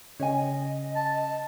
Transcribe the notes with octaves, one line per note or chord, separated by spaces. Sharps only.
C#3 C#5 D#5 G#5
A5